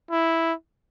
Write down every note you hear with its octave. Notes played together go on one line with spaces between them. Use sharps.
E4